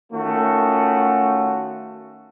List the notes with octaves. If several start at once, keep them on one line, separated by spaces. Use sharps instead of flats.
D#3 A3 C#4 F4 F#4